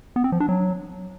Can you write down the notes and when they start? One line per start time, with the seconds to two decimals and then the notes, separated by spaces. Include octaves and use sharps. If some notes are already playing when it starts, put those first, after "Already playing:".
0.16 B3
0.24 C4
0.32 F3
0.40 D4
0.49 F#3